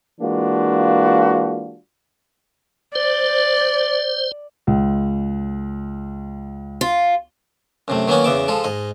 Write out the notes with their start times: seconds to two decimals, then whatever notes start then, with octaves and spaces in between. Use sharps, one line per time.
0.20 E3 G#3 A#3 D4 F4 F#4
2.95 C5 D5
4.67 C#2
6.81 F4
7.88 F#2 C3 A3
8.08 D#3 F#3 A#3 B3 C#4 F#4
8.24 E2 C#3 B3 E5 D6
8.48 F3 G#3 A4
8.64 G#2 D#5